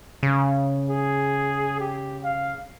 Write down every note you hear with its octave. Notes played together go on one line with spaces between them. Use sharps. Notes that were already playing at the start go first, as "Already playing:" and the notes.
C#3
G#4
G4
F5